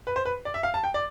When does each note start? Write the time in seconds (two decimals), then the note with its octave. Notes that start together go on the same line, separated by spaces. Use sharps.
0.07 B4
0.16 C5
0.25 B4
0.45 D5
0.54 E5
0.63 F5
0.74 A5
0.84 G5
0.94 D5